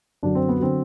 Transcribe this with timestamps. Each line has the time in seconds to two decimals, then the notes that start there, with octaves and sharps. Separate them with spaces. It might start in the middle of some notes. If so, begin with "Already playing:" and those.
0.23 F#2 D3 F#3 D4
0.35 C4
0.48 B3
0.60 D3 F#3 C4